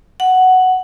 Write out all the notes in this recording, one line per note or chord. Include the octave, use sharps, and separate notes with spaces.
F#5